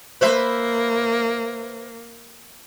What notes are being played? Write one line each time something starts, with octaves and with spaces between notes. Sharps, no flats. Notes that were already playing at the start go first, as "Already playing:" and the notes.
A#3 B4 C5 E5